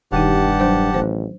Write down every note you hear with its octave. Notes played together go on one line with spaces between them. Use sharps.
E1 G2 D#3 D#4 G4 F#5 A5
F#3 D4 C5
A1 C5